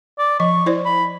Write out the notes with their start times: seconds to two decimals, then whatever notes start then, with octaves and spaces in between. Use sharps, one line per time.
0.19 D5
0.40 F3 D#5 C#6
0.66 E4 C5 D5
0.85 B5